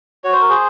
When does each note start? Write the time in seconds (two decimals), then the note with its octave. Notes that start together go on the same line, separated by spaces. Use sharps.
0.24 F#4 C#5
0.32 C5
0.41 A#4
0.49 G#4 C5